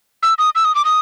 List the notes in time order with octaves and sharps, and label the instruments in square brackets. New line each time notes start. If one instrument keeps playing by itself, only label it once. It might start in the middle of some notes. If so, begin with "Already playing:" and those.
[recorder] E6
D#6
E6
D#6
D6
D#6